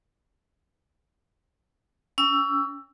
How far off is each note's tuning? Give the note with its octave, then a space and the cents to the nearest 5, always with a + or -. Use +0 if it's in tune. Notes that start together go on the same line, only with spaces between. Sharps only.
C#4 +30 G5 +40 E6 +10